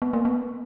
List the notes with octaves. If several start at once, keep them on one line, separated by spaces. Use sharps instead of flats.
B3
A#3
B3